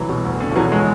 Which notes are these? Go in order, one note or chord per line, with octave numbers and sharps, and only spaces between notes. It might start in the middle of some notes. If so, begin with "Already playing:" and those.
Already playing: C2 E3 F#3
B2
D2
D3
F3
B2 E3 F#3
F#3 G#3